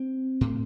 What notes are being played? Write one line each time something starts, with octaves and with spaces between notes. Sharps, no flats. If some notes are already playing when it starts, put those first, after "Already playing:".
Already playing: C4
A2